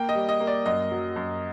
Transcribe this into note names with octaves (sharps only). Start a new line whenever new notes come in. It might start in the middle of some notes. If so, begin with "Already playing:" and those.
Already playing: A#3 G5
D#5
G3
D#5
A#3
D5
F#2 D#5
F#3
F#2